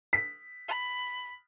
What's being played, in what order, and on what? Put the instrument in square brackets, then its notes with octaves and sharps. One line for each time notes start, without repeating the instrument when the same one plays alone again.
[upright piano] B6
[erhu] B5